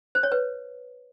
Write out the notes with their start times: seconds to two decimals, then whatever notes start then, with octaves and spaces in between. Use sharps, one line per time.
0.15 C5
0.23 C#5
0.32 B4